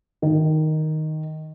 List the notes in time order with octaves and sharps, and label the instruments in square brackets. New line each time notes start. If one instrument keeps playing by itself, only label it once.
[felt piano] D#3